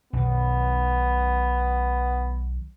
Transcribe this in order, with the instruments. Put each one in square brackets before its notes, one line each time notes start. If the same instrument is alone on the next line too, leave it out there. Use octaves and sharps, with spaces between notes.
[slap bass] B1 B2 D#3 [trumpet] B3